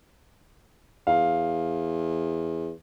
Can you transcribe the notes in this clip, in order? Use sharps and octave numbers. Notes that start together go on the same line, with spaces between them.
E2 F5